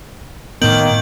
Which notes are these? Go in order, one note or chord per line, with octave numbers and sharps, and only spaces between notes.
A2 D#3 A#3 B3 G6 D7 F#7